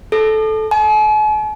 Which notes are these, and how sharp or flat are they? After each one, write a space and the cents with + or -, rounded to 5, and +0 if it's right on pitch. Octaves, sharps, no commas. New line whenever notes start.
A4 -15
G#5 +45